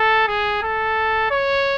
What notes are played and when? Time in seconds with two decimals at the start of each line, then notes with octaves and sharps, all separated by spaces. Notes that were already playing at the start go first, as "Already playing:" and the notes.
Already playing: A4
0.28 G#4
0.63 A4
1.31 C#5